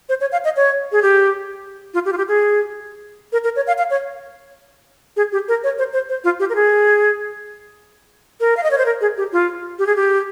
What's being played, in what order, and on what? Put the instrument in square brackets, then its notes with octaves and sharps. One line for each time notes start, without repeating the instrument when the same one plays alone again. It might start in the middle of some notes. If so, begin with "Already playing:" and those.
[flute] C5
C#5
F5
D#5
C#5
G#4
G4
F4
G4
F4
G4
G#4
A#4
A#4
C#5
F5
F5
C#5
G#4
G4
A#4
C#5
C5
C5
C5
F4
G4
A#4
G#4
A#4
F5
D#5
C#5
C5
A#4
G#4
G4
F4
G4
G#4
G4